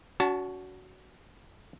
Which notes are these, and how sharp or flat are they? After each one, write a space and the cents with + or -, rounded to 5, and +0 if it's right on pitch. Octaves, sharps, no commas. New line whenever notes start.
C#4 +45 F#4 +5 A5 +0